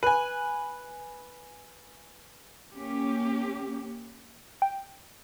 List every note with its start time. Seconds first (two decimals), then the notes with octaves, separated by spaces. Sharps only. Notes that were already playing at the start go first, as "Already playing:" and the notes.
0.03 B4 G#5
2.76 A#3 C#4 G4
4.62 G5